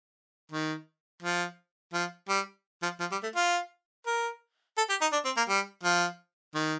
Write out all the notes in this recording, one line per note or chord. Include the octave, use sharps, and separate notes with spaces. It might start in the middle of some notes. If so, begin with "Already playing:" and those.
D#3
F3
F3
G3
F3
F3
G3
A3
F4
A#4
A4
G4
D#4
D4
C4
A#3
G3
F3
D#3